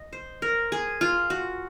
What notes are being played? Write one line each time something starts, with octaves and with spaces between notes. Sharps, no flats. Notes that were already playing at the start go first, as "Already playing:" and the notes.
Already playing: D#5
C5
A#4
G#4
F4
F#4